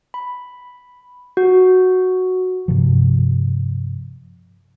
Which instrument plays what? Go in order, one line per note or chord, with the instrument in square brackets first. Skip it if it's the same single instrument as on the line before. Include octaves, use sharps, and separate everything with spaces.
[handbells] B5
F#4
[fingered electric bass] G2 C3 F3